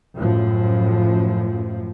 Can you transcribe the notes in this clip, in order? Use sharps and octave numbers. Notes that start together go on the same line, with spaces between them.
F#2 A2 F3